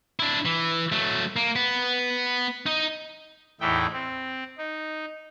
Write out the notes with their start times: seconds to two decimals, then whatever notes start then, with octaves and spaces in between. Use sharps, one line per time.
0.20 D4 E4
0.45 E3
0.92 F#3 A3
1.36 A#3
1.56 B3
2.66 D#4 D#5
3.61 E2 A2 E3 D#4 E4 G5
3.93 C4
4.58 D#4